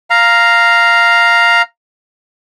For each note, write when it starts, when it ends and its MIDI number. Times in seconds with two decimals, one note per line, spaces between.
0.10 1.62 77
0.10 1.62 82